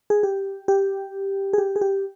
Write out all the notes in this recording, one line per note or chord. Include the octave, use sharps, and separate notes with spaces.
G#4
G4
G4
G#4
G4
G#4
G4